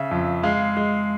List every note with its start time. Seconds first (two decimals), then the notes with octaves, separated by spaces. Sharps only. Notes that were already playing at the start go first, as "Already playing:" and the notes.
Already playing: C#3 E5
0.11 F2
0.43 G#3 F5
0.77 G#3